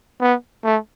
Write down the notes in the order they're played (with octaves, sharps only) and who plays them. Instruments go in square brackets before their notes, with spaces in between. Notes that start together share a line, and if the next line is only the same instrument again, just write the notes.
[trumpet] B3
A3